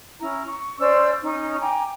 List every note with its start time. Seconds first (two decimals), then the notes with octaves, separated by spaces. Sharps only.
0.21 C#4 E4 A#5
0.46 C#6
0.79 C#4 C5 D5 E6
1.23 C#4 D#4
1.60 G5 G#5 A#5 D6